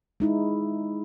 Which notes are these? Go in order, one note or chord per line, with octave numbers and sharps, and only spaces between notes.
G#3 D#4 E4